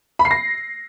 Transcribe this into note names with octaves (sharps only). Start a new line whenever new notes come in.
B5
C7
A#6